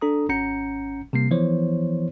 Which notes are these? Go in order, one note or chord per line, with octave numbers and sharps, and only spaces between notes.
D4 A4 A#5 D#6
G#1 C#4 F#5 A#5 G6 C#7
C3 G3 A#3 C7
E3 F3 B3 E4 C5 C#5